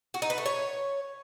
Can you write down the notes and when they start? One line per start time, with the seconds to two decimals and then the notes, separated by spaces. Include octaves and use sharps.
0.14 F#4
0.22 D#4
0.30 B4
0.38 A3
0.46 C#5